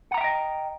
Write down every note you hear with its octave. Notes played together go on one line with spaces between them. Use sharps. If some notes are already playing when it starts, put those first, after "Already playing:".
D#5 E5 F#5 G5 A#5